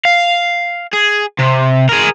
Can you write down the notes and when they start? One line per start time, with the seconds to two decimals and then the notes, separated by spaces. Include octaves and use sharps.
0.05 F5
0.93 G#4
1.39 C3
1.89 G#4 A#4